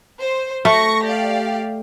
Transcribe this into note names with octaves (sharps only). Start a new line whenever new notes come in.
C5
A3 C#6 A#6
G4 D5 F5